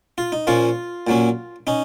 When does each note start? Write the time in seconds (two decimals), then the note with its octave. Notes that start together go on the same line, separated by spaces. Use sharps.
0.18 F4
0.32 D#4
0.47 A#2 F3 A#3 C#4 F4
1.07 A#2 F#3 A#3 C#4
1.67 C#4 D#4